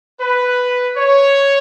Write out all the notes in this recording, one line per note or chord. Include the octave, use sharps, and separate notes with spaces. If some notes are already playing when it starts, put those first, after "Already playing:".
B4
C#5